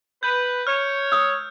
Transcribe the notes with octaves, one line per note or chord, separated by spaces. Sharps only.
B4 G6
C#5 F6
D#6 E6